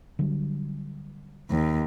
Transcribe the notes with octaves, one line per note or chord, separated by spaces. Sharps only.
D3 F#3 G3
D#2